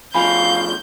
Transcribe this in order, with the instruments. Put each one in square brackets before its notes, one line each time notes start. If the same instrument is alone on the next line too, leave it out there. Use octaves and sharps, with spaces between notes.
[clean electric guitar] D2 F3 [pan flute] F5 [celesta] G#5 B5 [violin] G6